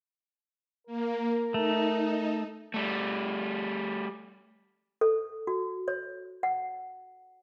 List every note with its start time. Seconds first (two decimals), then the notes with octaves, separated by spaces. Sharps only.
0.87 A#3 A#4
1.54 A3 D#4
2.74 G3 A3
5.01 A4
5.47 F#4
5.88 C#5
6.43 F#5